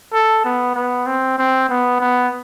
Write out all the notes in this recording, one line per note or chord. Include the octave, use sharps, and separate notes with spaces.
A4
B3
B3
C4
C4
B3
B3